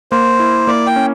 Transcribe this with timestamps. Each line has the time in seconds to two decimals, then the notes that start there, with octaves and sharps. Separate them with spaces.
0.11 A#3 C5
0.40 E4
0.67 A#3 D5
0.87 G5
0.96 C#4